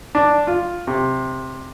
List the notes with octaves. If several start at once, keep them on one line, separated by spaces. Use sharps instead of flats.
D4
F4
C3